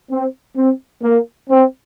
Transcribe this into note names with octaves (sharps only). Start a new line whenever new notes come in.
C4
C4
A#3
C4